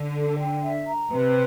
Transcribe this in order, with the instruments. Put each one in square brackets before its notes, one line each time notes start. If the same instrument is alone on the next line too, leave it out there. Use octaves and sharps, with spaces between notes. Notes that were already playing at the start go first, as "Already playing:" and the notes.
Already playing: [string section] D3
[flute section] A4
G5
E5
A#5
[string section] C3 [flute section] B4